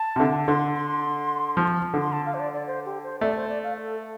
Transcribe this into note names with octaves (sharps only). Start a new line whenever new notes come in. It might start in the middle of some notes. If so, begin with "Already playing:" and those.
Already playing: A5
C3
D3
D3 C6
C6
F3
D3
C6
A5
F5
C5
D5
D5
C5
G4
C5
A3 D5
C5
D5
F5
A4